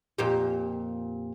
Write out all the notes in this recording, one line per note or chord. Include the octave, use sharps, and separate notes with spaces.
F2 A#2 G4